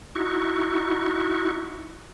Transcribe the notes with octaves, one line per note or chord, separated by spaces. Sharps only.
D#4 E4 F#4 C#6